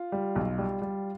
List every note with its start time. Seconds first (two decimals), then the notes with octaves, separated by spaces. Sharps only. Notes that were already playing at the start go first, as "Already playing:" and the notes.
Already playing: F4
0.12 G3
0.36 B1
0.58 G3
0.82 G3